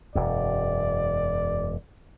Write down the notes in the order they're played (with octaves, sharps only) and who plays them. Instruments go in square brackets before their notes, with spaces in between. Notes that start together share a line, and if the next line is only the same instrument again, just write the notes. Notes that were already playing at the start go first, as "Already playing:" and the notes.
[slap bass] E1 F#2 [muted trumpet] D5